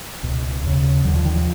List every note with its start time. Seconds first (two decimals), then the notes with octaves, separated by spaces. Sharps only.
0.23 C#2 B2
0.64 D#2 C#3
1.05 D#2 D3 F#3
1.16 F3
1.25 D#3
1.35 F3